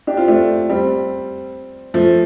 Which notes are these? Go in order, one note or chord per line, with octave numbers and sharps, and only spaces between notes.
D4 G4
C4 F4
A3 D4
G3 C4
F3 A3